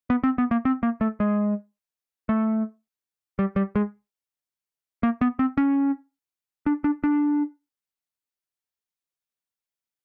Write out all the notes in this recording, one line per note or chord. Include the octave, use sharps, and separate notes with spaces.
B3
C4
B3
A#3
C4
A#3
A3
G#3
A3
G3
G3
G#3
A#3
B3
C4
C#4
D4
D4
D4